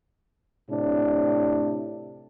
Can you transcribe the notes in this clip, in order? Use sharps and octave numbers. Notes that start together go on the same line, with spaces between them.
A2 C3 D4